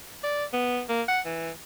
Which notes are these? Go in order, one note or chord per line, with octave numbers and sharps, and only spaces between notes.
D5
B3
A#3
F#5
E3